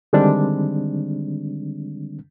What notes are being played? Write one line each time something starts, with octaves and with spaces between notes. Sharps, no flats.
D3 D#3 G3 G#3 C4 D4